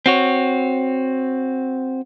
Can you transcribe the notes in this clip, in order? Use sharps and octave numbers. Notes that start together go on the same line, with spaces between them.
C4 F#4 C#5